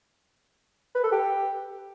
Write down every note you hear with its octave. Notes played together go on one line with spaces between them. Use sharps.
B4
A4
G4